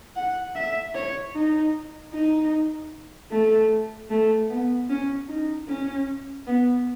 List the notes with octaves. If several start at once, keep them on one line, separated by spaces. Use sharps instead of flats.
F#5
E5
C#5
D#4
D#4
A3
A3
B3
C#4
D#4
C#4
B3